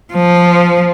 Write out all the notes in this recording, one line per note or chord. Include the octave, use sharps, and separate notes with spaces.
F3